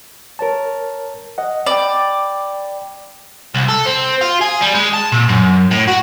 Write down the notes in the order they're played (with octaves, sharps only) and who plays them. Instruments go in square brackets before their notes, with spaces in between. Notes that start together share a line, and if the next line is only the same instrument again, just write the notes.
[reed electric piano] A#4 C#5 A5
D#5 F#5
[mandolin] D5 [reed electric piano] G5 B5
[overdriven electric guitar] C2
A4
C4
F4
G#4
G3
G#3
A5
A#2
F#2
A2
F#4